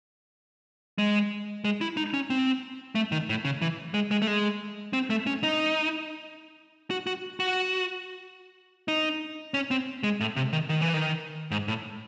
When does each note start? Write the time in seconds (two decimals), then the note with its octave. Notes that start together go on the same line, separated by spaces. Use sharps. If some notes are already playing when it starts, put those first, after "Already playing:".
0.98 G#3
1.65 G#3
1.81 E4
1.97 D#4
2.14 C#4
2.30 C4
2.95 A3
3.12 D#3
3.29 A2
3.45 C#3
3.62 E3
3.94 G#3
4.11 G#3
4.22 A3
4.27 G#3
4.93 C4
5.10 A3
5.27 C#4
5.43 D#4
6.90 F#4
7.07 F#4
7.40 F#4
8.88 D#4
9.54 C#4
9.71 C4
10.03 G#3
10.20 A2
10.36 C3
10.53 D#3
10.69 D#3
10.81 E3
10.94 D#3
11.51 G#2
11.68 A2